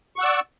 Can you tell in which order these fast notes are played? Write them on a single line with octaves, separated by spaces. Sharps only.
C#6 F#5 E6 D5